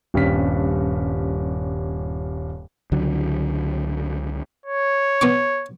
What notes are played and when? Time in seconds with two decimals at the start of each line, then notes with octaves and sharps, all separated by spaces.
0.14 D#1 G2 C4 C#4 F6 B6
2.92 C#2 D3 F#3
4.66 C#5
5.21 B3 C#6 D6